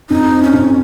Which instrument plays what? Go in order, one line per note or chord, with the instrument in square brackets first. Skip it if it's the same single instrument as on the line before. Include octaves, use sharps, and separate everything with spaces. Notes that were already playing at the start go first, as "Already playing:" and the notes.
[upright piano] F2 [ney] D#4
[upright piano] C4
[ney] C#4
[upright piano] F2